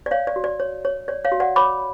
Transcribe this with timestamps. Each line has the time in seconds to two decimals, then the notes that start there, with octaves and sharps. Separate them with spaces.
0.06 D5
0.11 C#5 F5
0.27 D5
0.36 F#4
0.44 D5
0.60 C#5
0.85 C#5
1.08 C#5 D5
1.24 C#5 F5
1.32 F#4
1.40 D5 F#5
1.56 C#5 B5 D6